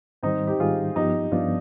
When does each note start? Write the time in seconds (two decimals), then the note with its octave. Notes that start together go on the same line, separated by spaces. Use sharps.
0.23 G#2 D#3 G3 C4 D#4
0.47 D#4 G4
0.59 G#2 D#3 G3 F4 G#4
0.96 G2 F3 B3 D#4 G4
1.32 G2 F3 B3 D4 F4